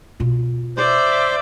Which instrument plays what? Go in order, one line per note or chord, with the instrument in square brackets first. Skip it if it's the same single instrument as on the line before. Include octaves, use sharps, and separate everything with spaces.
[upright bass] B2 F4
[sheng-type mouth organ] C5 [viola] D5 E5